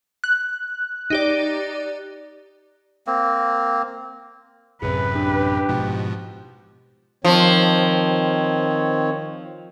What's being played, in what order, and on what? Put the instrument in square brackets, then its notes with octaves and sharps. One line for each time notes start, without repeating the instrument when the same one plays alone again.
[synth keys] F#6
[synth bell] D#4 G4 D5
[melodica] A#3 C4
[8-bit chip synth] A1 F#2 C3 [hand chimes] G#4 [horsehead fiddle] B4
[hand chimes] D4 [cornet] G4
[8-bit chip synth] G#2 B2 F3 [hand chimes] F#6
[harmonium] D#3 C4 C#5 [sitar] F3